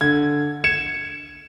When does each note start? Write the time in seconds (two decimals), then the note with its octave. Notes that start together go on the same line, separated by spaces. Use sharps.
0.01 D3 G#6
0.64 G#6 C#7 E7